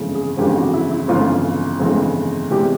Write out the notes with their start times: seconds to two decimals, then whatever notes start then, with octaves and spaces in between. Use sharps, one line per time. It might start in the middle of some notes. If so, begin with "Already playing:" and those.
Already playing: G1 F2 C#3 E3 G#3
0.15 G#4
0.37 G1 F2 C#3 E3 G#3 G4
0.56 F#4
0.74 E4
0.91 E4
1.08 G1 F2 C#3 E3 G#3 F4
1.80 G1 F2 C#3 E3 G#3
2.50 E2 C3 E3 G#3 G4